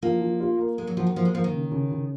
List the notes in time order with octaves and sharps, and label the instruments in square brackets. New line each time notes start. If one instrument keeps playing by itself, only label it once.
[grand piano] F3 [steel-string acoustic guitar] A#3
[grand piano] F3
F4
A#3
[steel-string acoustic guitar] G#3 [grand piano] A#3
[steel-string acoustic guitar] F#3
[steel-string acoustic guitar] F3 [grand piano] F#4
[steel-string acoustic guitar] D#3
[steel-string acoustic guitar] F3 [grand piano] A#3
[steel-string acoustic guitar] G#3
[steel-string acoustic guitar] F3 [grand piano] A#3
[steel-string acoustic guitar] D#3
[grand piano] C#3
C#3
C#3